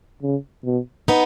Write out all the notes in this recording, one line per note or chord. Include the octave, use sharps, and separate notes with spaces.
C#3
B2
B3 D#4